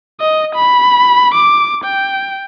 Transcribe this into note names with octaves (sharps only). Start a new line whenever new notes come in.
D#5
B5
D6
G5